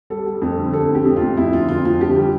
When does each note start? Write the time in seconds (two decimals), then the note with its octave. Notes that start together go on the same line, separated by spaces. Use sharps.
0.10 G3 A4
0.26 G3
0.42 F2 A4
0.58 D3
0.73 D3 A4
0.89 F2
0.95 G4
1.05 F2
1.16 F4
1.22 F2
1.37 F2 E4
1.53 D3 F4
1.69 F2 F4
1.85 F2 F4
2.01 D3 G4
2.16 G3